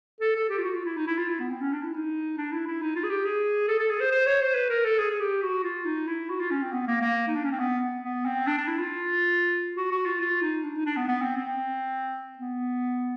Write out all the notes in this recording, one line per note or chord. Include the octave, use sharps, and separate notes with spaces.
A4
A4
G4
F4
F#4
F4
E4
D#4
E4
F4
E4
B3
C4
C#4
D4
E4
D#4
D4
E4
E4
D#4
F4
G#4
G4
G#4
A4
A4
G#4
C5
C5
C#5
C5
B4
A#4
A4
G#4
G#4
G4
F#4
F4
D#4
E4
F#4
F4
C#4
C4
B3
A#3
A#3
D#4
D4
C#4
C4
B3
B3
C4
D4
D4
E4
F4
F#4
F#4
F4
F4
D#4
D4
D#4
D4
B3
B3
C4
C4
B3